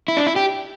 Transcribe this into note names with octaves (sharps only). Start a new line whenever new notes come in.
E4
D4
E4
G4